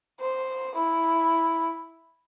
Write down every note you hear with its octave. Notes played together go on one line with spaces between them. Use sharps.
C5
E4